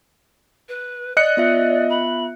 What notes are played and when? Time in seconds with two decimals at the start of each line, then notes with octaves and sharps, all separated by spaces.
0.68 B4
1.17 D5 D#5 F#6 C#7
1.37 B3 F4 E5
1.89 B5